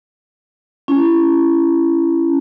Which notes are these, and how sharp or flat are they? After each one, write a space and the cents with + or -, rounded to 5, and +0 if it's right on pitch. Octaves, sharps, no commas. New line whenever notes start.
C#4 +0 E4 +25